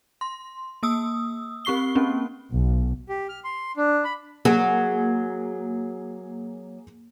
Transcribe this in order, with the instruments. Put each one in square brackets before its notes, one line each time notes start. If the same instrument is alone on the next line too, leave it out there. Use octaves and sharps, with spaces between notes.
[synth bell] C6
A#3 D#6 E6
C4 G4 C#6 C7 G7
A#3 C4 C#4
[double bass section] B1
[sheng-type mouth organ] G4
F6
C6
D4
B5
[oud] F#3 [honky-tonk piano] A#3 G#4